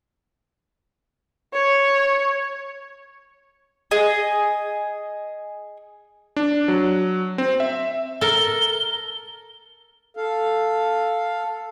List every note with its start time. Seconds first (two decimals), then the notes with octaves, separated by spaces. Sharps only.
1.53 C#5
3.91 G#4 D#5
6.36 D4
6.68 F#3
7.38 C4
7.60 E5
8.21 A4 A#4 G7
10.17 A4 F5